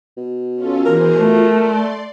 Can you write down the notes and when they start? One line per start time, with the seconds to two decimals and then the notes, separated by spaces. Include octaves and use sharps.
0.17 B2
0.56 C#4 F4 A4
0.86 E3 G#4 A#4 C5
1.17 A3 F4
1.55 D5 C6